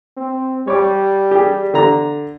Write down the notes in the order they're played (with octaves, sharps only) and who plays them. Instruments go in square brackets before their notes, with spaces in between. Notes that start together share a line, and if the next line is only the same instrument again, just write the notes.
[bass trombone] C4
[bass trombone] G3 [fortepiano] C#5 D6
[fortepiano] G4 G#4
D3 A#5